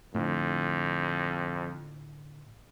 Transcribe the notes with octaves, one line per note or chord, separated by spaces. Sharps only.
F2 A2 D3